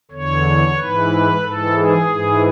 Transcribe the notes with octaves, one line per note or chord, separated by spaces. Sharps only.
E2 D3 C#5
G#2 E3 B4
G#2 E3 A4
G#4
G#2 E3